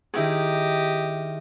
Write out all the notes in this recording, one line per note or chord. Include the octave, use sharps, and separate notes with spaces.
D#3 E4 G4 G#4 D#5